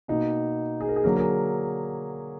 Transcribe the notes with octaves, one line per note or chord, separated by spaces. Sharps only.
B2 A#3 D#4
G#4
A#4
G#4
D3 F#3 A#3 A#4
A#4
G#4